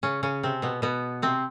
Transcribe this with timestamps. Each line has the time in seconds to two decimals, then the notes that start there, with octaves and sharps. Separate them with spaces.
0.03 C#3 C#4
0.23 C#3 C#4
0.43 C3 C4
0.62 B2 B3
0.82 B2 B3
1.22 C3 C4